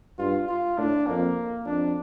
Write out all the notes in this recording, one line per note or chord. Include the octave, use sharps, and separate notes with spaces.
G2 F4
F4
A2 D4
F2 A#3
F2 D4